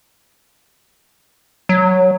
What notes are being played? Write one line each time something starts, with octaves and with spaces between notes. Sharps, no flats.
F#3